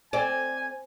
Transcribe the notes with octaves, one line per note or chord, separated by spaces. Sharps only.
C4 D5 G#5